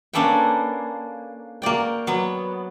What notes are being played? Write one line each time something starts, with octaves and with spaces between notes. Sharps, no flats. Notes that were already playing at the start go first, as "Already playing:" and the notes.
A#3 C#4 D4 A4 B4 G5
A#3 F#4 D5 G5
F#3 B3